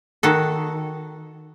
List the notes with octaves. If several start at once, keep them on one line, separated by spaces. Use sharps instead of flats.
D#3 F#4 A4